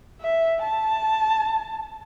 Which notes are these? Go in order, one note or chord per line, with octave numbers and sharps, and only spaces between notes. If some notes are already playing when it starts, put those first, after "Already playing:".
E5
A5